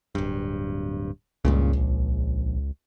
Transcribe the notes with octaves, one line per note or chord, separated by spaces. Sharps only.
D1 G2
C#2 G2 A#2 C#3
A#1